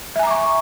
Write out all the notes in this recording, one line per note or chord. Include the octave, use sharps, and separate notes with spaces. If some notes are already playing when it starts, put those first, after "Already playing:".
E5 G#5 A#5 C#6 D6